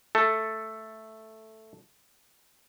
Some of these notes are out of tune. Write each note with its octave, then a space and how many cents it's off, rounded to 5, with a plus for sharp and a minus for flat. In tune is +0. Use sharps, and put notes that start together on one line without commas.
A3 +0 A4 +0